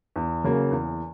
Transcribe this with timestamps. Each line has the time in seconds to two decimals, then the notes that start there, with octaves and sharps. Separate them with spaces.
0.16 E2
0.44 C#3 F#3 A#3
0.71 E2